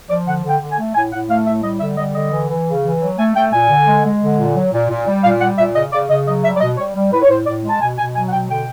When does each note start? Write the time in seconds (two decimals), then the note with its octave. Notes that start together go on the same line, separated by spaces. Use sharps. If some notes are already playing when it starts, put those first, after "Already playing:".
0.09 F3 D5
0.26 D3 F#5
0.43 D3
0.49 G5
0.60 D3
0.71 G#5
0.78 A3
0.94 A2 G#5
1.12 A2 F#5
1.29 A3 F5
1.46 A2 E5
1.63 G3 D#5
1.80 D3 E5
1.97 G3 D#5
2.14 D3 D#5
2.31 E3
2.49 E3
2.67 C#3
2.84 E3
3.00 F#3
3.18 A3 G#5
3.34 A3 G5
3.52 A#2 G#5
3.69 D3
3.86 G#3
4.04 G#3
4.21 D3
4.38 A#2
4.54 F#3
4.72 A#2
4.89 A#2
5.07 G3
5.23 A#2 F5
5.40 G3 F#5
5.57 A#2 E5
5.74 C#3 D#5
5.92 C#3 D5
6.09 C#3 D#5
6.27 F#3 D#5
6.44 G3 E5
6.56 D5
6.60 B2 D#5
6.77 G3 C#5
6.95 G3
7.12 A2 B4
7.22 C#5
7.29 A2 C5
7.46 A2 D5
7.63 G#3
7.69 A5
7.80 B2 G#5
7.98 B2 G#5
8.15 F#3 G#5
8.28 F#5
8.32 B2 G5
8.49 D3 G5